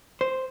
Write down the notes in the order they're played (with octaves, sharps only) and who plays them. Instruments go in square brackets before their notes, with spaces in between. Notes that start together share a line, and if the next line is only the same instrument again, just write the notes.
[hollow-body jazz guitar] C5